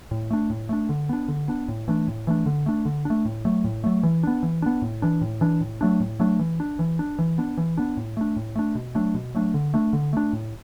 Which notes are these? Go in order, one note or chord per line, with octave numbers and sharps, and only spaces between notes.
A2
A3 D4
A2
A3 D4
D3
B3 D4
D3
B3 D4
A2
E3 A3 D4
A2
E3 A3 D4
D3
A3 D4
D3
A3 D4
A2
F#3 A3
A2
F#3 A3
E3
B3 D4
E3
B3 D4
A2
E3 D4
A2
E3 D4
A2
F#3 A3 D4
A2
F#3 A3 D4
E3
D4
E3
D4
E3
B3 D4
E3
B3 D4
A2
A3 D4
A2
A3 D4
B2
F#3 A3 D4
B2
F#3 A3 D4
D3
A3 D4
D3
A3 D4
A2